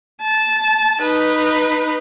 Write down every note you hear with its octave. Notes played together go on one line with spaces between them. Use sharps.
A5
D#4 B4